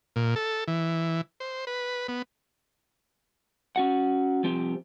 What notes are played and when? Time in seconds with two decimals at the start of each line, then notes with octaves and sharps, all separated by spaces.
0.16 A#2
0.36 A4
0.68 E3
1.40 C5
1.67 B4
2.08 B3
3.76 C#4 F#4 F#5
4.43 C2 F3 C4 G4